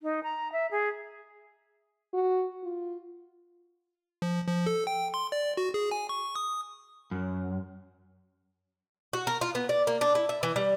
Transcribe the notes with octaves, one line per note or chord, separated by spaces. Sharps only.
D#4
A#5
E5
G#4
F#4
F4
F3
F3
A4
G5
C6
D5
F#4
G#4
G#5
C#6
D#6
F#2
F#4
A#4
F4
B3
D5
A#3
D4
E4
E5
E3
G3